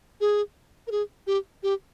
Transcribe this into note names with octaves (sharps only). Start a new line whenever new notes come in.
G#4
A#4
G#4
G4
G4